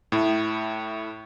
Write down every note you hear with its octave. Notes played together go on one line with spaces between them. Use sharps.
A2 E4